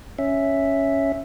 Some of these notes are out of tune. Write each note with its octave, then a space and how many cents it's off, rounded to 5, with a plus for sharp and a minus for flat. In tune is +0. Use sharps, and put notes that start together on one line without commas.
C#4 +0 E5 +0